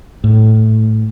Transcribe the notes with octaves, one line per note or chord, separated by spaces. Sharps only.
A2